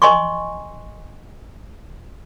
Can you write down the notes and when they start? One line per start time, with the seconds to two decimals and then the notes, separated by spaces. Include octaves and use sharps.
0.02 D#5 G#5 C6 C#6